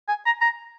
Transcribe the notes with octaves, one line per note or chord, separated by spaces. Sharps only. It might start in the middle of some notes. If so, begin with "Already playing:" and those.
G#5
A#5
A#5